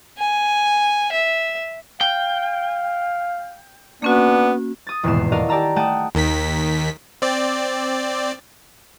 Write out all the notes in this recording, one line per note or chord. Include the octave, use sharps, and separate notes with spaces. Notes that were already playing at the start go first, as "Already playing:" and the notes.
G#5
E5
F5 G5
A#3 B3 C#4 D4 F#4
D#6 A6
D#1 E2 G#2 B2 C7 E7
F#4 A4 A#4 D5 D#5 F5
G4 D5 A5 A#5 E6
A3 F#5 G5 A5 D#6 E7
D#2 D#3 B6
C4 D5